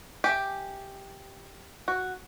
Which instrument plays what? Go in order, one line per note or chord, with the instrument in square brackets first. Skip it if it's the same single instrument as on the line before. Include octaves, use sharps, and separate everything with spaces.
[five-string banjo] G4 [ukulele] E5 G5 G#5
[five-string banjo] F#4